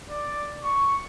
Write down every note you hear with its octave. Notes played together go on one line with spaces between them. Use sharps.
D5
C#6